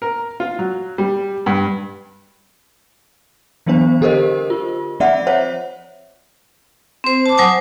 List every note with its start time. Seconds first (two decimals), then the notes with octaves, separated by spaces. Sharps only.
0.02 A#4
0.40 F4
0.59 F#3
0.98 G3
1.46 G2
3.67 E3 F#3 B3 D4 C5
4.01 D3 G4 A4 A#4 C5 D#5
4.50 F4
5.00 F3 C4 D5 E5 F#5
5.27 C5 C#5 E5 F#5
7.04 C4 C5
7.26 A5 D6
7.37 F#3 C5 G#5 D#6